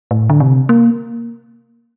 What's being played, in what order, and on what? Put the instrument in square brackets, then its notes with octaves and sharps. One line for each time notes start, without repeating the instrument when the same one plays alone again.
[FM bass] A2
D3
C3
A#3